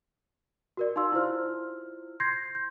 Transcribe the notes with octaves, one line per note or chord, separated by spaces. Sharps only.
F#4 A#4 D5
D#4 F5 C6 E6
E4 F4 C5 F6
C6 G6 G#6 A#6 C7
G6